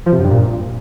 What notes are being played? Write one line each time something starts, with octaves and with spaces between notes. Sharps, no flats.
F3
C3
F#2
G2
A#2